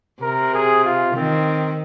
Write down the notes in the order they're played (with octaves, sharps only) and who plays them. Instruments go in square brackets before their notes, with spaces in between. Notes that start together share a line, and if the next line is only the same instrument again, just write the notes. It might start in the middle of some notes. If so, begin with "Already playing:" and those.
[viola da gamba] C3 [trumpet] A#4
[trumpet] G#4
F4
[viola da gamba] D#3 [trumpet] C4